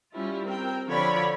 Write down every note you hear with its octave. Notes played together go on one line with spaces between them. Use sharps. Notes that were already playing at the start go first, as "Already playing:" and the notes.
G3 C#4 E4 F4
C4 A#4 G5
D3 F3 C#5 D5 B5